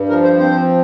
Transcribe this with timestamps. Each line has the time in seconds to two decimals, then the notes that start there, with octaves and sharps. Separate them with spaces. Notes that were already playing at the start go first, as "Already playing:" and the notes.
Already playing: G2
0.09 F3 A#4
0.24 C5
0.38 C4 C5